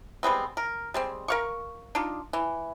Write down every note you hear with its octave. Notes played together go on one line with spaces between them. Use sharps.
G3 G#3 B3 C4
A#4
G3 G#3 C4
A#4 F5 C#6
D4 D#4 F4
E3